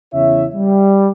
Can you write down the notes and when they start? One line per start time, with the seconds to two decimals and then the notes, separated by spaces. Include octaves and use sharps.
0.14 E2 C#3 E4 C#5 E5
0.55 G3